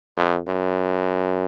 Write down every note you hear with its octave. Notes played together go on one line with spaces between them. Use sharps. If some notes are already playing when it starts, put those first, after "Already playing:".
F2
F#2